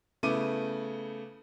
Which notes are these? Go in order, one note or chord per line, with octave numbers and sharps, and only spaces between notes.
C#3 A3 B3 E4 D6 D#7